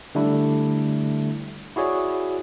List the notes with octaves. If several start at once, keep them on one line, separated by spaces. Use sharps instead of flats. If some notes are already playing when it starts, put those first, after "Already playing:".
D3 G3 A3 D4 E4
E4 F#4 G#4 C#5 D5